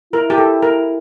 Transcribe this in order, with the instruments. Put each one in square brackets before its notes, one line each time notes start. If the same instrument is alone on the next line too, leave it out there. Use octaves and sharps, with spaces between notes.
[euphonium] E4 [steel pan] A#4
[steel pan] G4
A4
A#4